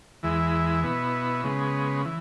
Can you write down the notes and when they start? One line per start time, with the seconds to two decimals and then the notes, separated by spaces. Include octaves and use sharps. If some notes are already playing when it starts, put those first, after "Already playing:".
0.23 E2 E3 G#3 E4
0.84 B2 B3 E4
1.44 C#3 G#3 B3
2.05 E3